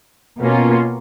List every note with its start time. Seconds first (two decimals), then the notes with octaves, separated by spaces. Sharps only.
0.39 B2 A#3 C#4 F4